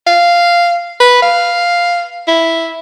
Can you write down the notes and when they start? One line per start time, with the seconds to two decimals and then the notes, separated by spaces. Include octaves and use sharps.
0.07 F5
1.00 B4
1.23 F5
2.28 E4